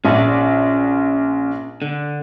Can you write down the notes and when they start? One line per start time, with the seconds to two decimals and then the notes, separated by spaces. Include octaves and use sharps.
0.05 A#1 C#4 D5
1.82 D3